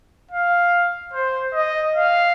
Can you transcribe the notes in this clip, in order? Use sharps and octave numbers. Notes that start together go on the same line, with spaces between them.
F5
C5
D#5
F5